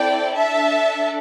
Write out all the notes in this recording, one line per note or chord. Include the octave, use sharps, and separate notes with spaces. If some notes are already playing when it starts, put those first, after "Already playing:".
Already playing: C4 E4 A4 D5 G5
D4 A4 E5 A5